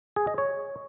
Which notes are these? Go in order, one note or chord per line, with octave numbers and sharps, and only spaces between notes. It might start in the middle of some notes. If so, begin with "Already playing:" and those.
G#4
D#5
C#5